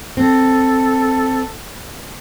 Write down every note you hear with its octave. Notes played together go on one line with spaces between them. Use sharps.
C4 A4